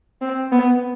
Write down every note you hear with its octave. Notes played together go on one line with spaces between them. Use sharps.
C4
B3